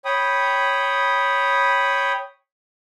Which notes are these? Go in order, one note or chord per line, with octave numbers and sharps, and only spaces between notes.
C#5 G5 B5 D#6